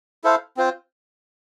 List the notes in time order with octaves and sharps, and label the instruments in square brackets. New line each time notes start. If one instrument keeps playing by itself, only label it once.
[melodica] E4 A4 C5 F5
C4 F4 C5